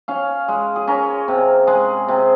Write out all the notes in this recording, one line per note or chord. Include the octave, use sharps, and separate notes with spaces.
C#4 F5
G#3
G#4
C#4 A#4
C3
G#3 G#4
C3